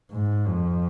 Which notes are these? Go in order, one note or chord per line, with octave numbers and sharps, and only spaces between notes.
G#2
F2